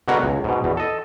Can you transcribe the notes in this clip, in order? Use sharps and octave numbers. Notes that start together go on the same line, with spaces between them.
B2 D3 G#3 B3 F#4 A#4
C#2
G#2 B2
E2 B2
A4 D#5